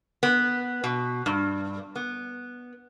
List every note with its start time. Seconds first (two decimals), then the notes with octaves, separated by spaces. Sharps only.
0.23 B3
0.84 B2
1.26 G2
1.96 B3